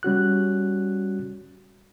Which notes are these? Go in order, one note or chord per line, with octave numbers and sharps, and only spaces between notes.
G3 C#4 F#4 F#6